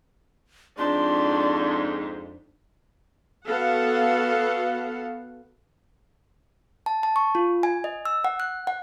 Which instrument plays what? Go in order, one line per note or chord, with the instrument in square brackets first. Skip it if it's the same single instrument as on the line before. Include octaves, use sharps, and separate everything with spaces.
[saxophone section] F2 G#2 [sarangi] D4 [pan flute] C6
[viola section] B3 F#4 A4 F5 F#5
[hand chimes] A5
A5
C#6
F4
G#5
D#5
E6
F#5
F#6
F#5